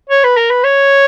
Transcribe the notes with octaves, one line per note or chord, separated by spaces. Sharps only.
C#5
B4
A#4
B4
C#5